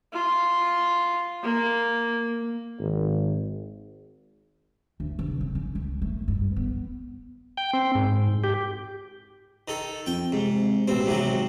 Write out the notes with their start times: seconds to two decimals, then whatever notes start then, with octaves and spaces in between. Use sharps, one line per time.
0.13 F4
1.43 A#3
2.79 G#1
5.00 D2
5.19 C3
5.41 C#3
5.55 C#4
5.75 C#2
6.02 A3
6.28 G2
6.56 B3
7.57 G5
7.73 C4
7.95 G#2
8.44 G4
9.68 D#3 A4
10.06 F2 G5
10.32 G#2 C3
10.88 A1 B2 C4
11.06 G#1 G#2 C3 F#3